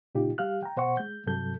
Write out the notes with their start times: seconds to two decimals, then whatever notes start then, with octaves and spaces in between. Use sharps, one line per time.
0.15 A#2 C#3 D#4 F4 G4
0.38 G3 G4 F5 F6 F#6
0.63 G5 A#5
0.77 B2 C5 F#5 C#6
0.97 G#3 G6
1.26 G2 C3 F#3 A4 G6